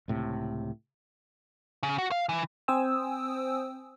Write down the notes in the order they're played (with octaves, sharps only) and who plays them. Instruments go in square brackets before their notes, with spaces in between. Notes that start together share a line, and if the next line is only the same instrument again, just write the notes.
[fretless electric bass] C#2 A2 C3
[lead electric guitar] C#3
F#4
F5
E3
[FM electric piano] C4 C5 G5 G#5 D#6 E6